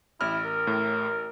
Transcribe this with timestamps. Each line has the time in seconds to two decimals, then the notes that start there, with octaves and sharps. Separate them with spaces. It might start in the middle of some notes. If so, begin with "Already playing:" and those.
0.21 A1 E4 F6
0.45 A#4
0.67 A2